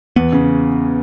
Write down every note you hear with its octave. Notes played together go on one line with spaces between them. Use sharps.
E2 B3
C#3